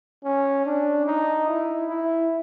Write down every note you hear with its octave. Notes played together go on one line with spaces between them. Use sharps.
C#4
D4
D#4
E4
E4